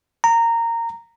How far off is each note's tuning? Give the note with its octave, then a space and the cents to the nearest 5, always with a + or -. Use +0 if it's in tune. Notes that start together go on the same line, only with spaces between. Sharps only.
A#5 -15